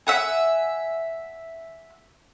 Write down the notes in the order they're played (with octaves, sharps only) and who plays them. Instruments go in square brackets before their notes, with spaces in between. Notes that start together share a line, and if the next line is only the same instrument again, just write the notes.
[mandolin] E5 F#5 G#5